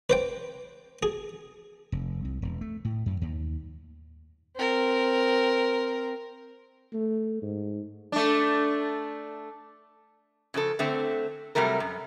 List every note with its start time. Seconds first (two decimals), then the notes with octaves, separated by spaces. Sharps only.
0.10 B4 C5 G5
1.03 G#4
1.92 F1
2.25 C2
2.42 E1
2.61 A3
2.85 A2
3.06 F#2
3.21 D#2
4.56 C4 A#4
6.94 A3
7.42 G#2
8.12 A3 D4
10.54 C#3 F3 D4 A4
10.79 D3 A3 C4
11.55 C3 F#3 G3 A3 A#4
11.80 F#2